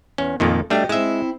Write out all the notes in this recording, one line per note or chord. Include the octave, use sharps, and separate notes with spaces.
E2 C#4
F2 A#2 D#3 A#3 A4
G3 A3 D4 F#4 G4 D#5
G#3 C4 E4 E5